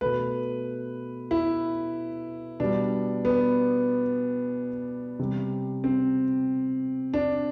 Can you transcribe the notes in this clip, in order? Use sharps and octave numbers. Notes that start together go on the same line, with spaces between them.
B2 A3 B4
E4
B2 G3 D4
B3
C3 G3
C4
D4